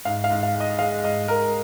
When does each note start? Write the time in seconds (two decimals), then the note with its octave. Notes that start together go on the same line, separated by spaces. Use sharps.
0.05 G#2 F5
0.24 F5
0.30 G#2
0.43 F5
0.55 G#3
0.60 D#5
0.79 G#3 F5
1.04 G#2 D#5
1.27 G#3 A#4